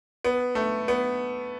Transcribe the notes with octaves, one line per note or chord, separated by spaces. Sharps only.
B3
A3
B3